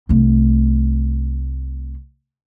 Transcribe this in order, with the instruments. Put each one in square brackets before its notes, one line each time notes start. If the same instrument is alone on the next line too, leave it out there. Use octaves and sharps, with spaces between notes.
[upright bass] C2 A3